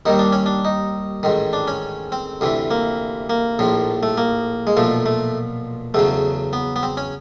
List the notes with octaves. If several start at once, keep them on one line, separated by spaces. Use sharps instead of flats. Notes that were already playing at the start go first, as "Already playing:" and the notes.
D#2 D#3 G3 D#4
D4
C#4
D4
D#4
A1 G#2 D#3
D4
C#4
C4
D2 C3 E3
A#3
A#3
A#1 A2 F3
A3
A#3
G#3
B1 A#2 F3 A3
A3
E2 C#3 F#3 A3
B3
B3
C4
C#4